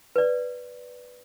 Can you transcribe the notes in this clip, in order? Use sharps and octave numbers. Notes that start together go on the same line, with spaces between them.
B4 D5